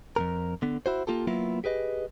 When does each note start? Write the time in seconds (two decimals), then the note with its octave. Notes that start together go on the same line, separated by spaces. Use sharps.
0.16 F2 A#2 A#4
0.62 D3 B3
0.86 E4 F#4 C5
1.07 A#3 F4 G4 A4
1.27 F#3 A#3 B3 E4 F4
1.64 G4 G#4 B4 D#5